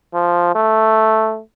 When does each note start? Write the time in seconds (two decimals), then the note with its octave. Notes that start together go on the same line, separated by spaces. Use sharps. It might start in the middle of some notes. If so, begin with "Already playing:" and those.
0.14 F3
0.55 A3